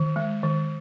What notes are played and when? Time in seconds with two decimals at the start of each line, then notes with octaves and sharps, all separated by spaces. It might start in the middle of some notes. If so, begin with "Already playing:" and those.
Already playing: D#3
0.16 G#3
0.43 D#3